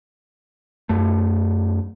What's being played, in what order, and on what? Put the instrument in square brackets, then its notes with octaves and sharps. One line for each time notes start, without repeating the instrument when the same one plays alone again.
[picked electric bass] F#2 A3